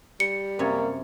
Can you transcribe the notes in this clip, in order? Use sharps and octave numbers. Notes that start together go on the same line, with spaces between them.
G3 C#7
F#2 C3 A#3 C#5